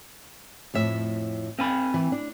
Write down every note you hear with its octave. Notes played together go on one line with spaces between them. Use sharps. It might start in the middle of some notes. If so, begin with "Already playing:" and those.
F2 A2 E5
C4 F5 G#5 B5
E3
D4